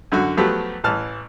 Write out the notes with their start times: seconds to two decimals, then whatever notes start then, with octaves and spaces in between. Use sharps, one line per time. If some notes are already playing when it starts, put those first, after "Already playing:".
0.12 F#2 D3 F#4
0.37 F3 F#3 A3 B3 G4
0.84 A1 E3 A5 F6